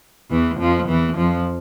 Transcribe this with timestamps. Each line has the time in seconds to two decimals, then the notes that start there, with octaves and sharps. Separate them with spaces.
0.31 E2 E3
0.60 F2 F3
0.88 E2 E3
1.17 F2 F3